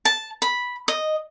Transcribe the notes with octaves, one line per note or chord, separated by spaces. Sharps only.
A5
B5
D#5